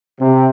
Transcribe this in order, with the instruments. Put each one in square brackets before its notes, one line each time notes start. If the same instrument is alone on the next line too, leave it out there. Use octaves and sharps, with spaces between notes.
[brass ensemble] C3